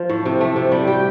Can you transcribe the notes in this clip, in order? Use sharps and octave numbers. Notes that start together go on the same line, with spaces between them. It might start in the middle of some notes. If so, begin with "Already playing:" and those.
Already playing: F3 F4
A2
C3
A3
C3
G3
G4